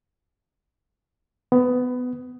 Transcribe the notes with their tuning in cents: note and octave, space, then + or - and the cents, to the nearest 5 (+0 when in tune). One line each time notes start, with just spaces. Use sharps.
B3 +20